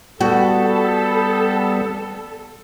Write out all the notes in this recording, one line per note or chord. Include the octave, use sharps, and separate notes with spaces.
G3 B3 F#4 A4